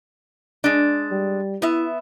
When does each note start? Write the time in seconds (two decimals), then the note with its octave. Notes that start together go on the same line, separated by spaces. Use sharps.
0.64 G#3 D4
1.11 G3
1.62 B3 E4 E5